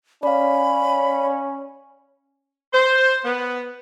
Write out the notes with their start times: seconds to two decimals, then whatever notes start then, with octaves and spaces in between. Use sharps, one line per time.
0.23 C#4 D5 F5 B5
2.73 C5
3.24 B3